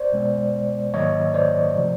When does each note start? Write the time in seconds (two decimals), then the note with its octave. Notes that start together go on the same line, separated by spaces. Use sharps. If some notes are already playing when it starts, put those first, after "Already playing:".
Already playing: C5 D5
0.12 B2 G#3 B3
0.94 G#2 D#3 F#3 A#3 C#5 D#5
1.34 C5 D5
1.75 C3 F3 A3